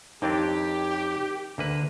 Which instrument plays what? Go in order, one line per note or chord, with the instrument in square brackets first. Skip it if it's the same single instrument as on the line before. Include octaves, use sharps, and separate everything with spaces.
[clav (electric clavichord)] F2 C4 D4 [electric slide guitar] D#4 A#4 C#5 [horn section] G4
[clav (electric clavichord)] D2 A#3 B4 [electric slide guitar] D3